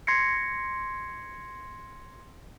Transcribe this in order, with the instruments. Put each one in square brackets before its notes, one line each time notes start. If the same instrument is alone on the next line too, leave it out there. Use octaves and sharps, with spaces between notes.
[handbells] C6 G#6 A#6 C7 C#7